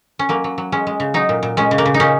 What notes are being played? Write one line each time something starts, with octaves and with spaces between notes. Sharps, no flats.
C#4
F#3 A#3
F#3
F#3
G#3 C#4
G#3
C#3
F#3 D#4
A#2
A#2
G#3 C#4
C#3
A#3
C#3
D#4
A#2 C#4